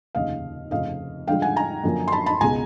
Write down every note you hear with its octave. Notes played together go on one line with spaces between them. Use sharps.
F1 D#2 C#3 D#5 F5
F1 F2 C#3 D#5 F5
G2 D3 F3 G#3 F5 G5
F#5 G#5
G#5 A#5
F#2 D3 F3 A#3
C6
A5 B5
A5 B5
C#2 B2 G#3 G#5 A#5